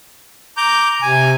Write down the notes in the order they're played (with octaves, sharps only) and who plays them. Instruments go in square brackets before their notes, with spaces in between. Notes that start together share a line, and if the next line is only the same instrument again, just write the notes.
[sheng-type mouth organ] A#5 D6 G6
[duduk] C3 [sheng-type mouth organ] G#5